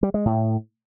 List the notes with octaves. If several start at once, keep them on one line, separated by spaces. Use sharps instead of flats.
G3
G#3
A2